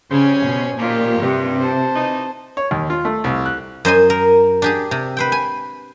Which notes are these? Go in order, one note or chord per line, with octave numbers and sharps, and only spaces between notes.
C#3 G3 C4 C#4 C5 G#5
B2
A#2 D#3 F3 A#3 F4 G4
G2 C3
C5 A5
E3 D#4
C#5
D#2
F4
A3
C2
F#6
F#2 C5 D#5 G#5
A#4
D4 G4 G#4
C3
B4 C5 G5
G#5